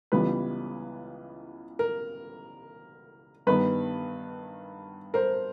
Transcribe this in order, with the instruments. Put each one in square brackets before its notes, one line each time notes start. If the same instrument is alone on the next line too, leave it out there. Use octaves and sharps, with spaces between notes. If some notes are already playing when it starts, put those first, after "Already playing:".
[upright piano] C#2 C#3 E3 G3 B3 B4
A#4
G2 D#3 G3 B3 B4
A#4 C5